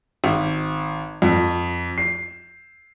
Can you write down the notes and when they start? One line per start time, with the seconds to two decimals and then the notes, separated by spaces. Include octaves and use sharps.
0.24 G#1
1.22 F2
1.98 C7